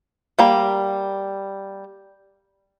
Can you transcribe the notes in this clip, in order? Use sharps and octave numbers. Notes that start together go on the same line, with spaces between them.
G3 A#3